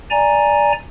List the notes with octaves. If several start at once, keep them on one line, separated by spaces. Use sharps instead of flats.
D5 G#5 A#5